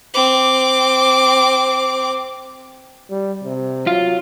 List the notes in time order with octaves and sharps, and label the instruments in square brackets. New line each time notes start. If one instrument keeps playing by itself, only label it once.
[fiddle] C4 D6
[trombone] G3
C3
[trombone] F#3 [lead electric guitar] F4